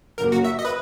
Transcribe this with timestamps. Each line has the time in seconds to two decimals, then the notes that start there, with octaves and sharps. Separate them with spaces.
0.18 F#2 C#3 F#3 A#3 A#4
0.32 F#4
0.45 E5
0.59 D#5
0.65 B4